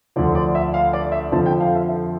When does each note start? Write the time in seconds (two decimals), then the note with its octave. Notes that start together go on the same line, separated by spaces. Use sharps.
0.16 D2 D3 F3 D5
0.35 D5
0.55 E5
0.74 F5
0.93 D5
1.12 E5
1.32 F2 D3 F3 A5
1.46 G5
1.60 F5
1.75 E5
1.89 E5